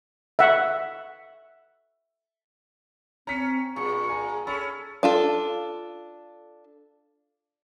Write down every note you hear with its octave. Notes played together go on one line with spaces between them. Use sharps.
E5 F#5
C4 C#4 A#5 B6 C#7
G2 A#2 G#4 C#6
G#5 A#5
C#4 A4 B5 C#6
D4 F4 A4